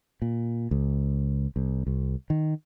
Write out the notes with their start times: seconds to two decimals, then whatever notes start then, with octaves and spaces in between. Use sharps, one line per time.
0.22 A#2
0.71 C#2
1.56 C2
1.87 C2
2.30 D#3